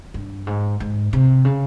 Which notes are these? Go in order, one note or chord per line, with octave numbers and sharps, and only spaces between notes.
G2
G#2
G#2
C3
C#3